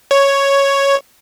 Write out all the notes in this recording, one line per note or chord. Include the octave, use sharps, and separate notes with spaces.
C#5